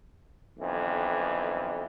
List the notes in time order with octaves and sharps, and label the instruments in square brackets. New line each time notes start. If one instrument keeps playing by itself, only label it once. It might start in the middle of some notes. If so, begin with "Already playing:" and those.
[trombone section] B1 F2 D3 E3